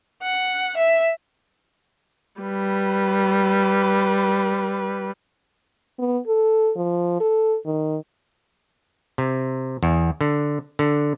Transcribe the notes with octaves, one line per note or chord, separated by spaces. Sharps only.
F#5
E5
G3 B4
B3
A4
F3
A4
D#3
C3
E2
D3
D3